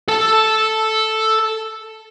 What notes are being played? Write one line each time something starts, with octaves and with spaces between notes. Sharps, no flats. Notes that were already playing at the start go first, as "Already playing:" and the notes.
A4 A5